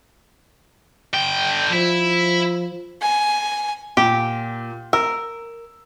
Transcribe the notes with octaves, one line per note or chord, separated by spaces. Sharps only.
D3 G5
F3 E4
G#5
A#2 G4
A#4 E6